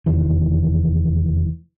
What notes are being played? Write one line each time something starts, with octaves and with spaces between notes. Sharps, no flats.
F1 E2 D#3 E3